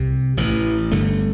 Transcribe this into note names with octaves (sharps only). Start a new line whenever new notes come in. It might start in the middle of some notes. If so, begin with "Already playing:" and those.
Already playing: C2 C3
A1 A2 E3
G1 G2 D3 A3